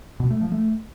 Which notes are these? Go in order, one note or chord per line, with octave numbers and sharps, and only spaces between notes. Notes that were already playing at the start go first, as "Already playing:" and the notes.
B2
A3
F3
A3